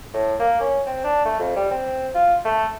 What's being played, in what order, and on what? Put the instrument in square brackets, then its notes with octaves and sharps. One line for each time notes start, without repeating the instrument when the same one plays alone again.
[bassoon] A2
A#3
C#4
C4
D4
A3
F2
G3
C4
F4
A3